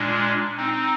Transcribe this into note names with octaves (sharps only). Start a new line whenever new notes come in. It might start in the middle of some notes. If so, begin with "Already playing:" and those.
Already playing: A#2 G#3 D4
C4 D#4